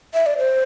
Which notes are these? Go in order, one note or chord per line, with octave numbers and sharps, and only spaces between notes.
E5
D5
C5